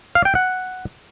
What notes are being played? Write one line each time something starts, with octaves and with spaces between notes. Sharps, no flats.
F5
G5
F#5